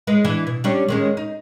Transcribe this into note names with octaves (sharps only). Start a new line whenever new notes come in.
G#3 D#4 B4
E3 D4
B2
G3 C#4 D4
D#3 G#3 C#4
D#4